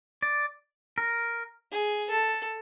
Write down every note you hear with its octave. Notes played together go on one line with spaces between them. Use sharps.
D5
A#4
G#4
A4